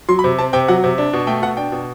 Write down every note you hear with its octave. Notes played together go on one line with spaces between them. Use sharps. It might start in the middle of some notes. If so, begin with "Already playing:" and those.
F#3 C6
B5
C3
C4 A5
C3 G5
F#3 F#5
C3
D4
B2
A3 G5
B2 F#5
D4 G5
B2